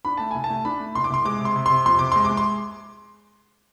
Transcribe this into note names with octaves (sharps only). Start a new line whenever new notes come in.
D4 B5
A3 A5
C2 G#5
A5
A3
D4 B5
A3
C2 C6
D6
C2 C6
G#3 D6
C3 C6
C3
C3 C6
F2 C6
C3 D6
G#3 C6
D6
G#3
C6